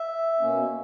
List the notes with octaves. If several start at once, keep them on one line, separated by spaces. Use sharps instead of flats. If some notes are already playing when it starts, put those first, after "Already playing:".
Already playing: E5
B2 A#3 C#4